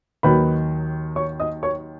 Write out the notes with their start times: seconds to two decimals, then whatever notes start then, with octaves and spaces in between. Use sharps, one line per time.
0.23 D#2 D#3 F#3 B4 B5
1.16 C#5 C#6
1.40 D#5 D#6
1.63 C#5 C#6